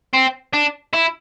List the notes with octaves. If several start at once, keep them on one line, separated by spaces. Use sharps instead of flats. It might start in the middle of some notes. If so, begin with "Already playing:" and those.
C4
D4
E4